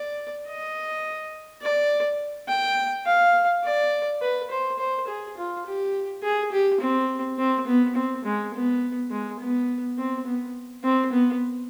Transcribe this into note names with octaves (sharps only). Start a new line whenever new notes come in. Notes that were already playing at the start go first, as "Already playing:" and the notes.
Already playing: D5
D#5
D5
G5
F5
D5
B4
C5
C5
G#4
F4
G4
G#4
G4
C4
C4
B3
C4
G#3
B3
G#3
B3
C4
B3
C4
B3